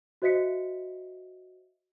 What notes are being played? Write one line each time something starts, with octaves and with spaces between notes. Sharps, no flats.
F#4 C5 D#5 E5 B6 C#7